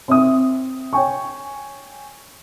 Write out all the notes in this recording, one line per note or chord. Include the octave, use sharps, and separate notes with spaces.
C4 E5 D#6
C#5 G5 G#5 C#6